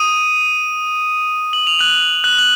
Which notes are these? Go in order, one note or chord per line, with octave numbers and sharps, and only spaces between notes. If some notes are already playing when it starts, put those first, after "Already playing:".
Already playing: D#6 D#7
F#7
F7
F#6 F#7
F#6 F#7
F#6 F#7